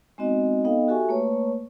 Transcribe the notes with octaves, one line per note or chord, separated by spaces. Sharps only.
G#3 B3 C4 D#4 F#4 D#5
B3 D#4 A4 D#5 F5 G5
F#4 G4 A4 E5 G#5 C#6
A3 A#3 B4 C#5 C#6